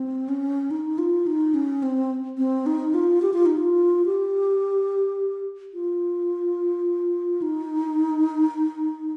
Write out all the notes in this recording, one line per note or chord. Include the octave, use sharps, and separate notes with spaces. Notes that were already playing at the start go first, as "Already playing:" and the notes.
Already playing: C4
C#4
D#4
F4
D#4
C#4
C4
C4
D#4
F4
G4
F4
D#4
F4
G4
F4
D#4